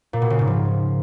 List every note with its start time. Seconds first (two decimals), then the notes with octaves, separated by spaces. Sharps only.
0.13 A#2
0.22 B2
0.30 C#3
0.39 G#2
0.47 F3